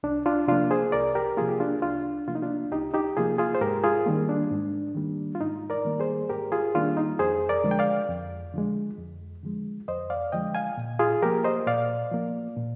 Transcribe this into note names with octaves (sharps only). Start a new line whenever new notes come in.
C2 D4
D4 F4
C3 F3 A#3 D4 F4
G#4 C5
C2 A#4 D5
G4 A#4
C3 F3 A#3 F4 G#4
G4
D4 F4
C2 D4 F4
C3 F3 A#3 F4
D#4
D4 F4
C2 D#4 G4
D#4 G4
C3 F3 A#3 F4 G#4
F4 G#4
C5
G#2 G4 A#4
F4 G#4
D#3 G3 A#3
D4
G#2
D#3 G3 A#3
F4
G#2 D#4
A#4 D5
D#3 G3 A#3
G#4 C5
G#2 G4 A#4
F4 G#4
D#3 G3 A#3 D4 F4
D#4
F2 G#4 C5
A#4 D5
D3 F3 G#3
G5
D5 F5
F2
D3 F3 G#3
F2
D3 F3 G#3
F2 C5 D#5
D5 F5
D3 F3 G#3 D#5 G5
F5 G#5
A#2
F4 G#4
F3 A#3 G4 A#4
C5 D#5
A#2 D5 F5
F3 A#3
A#2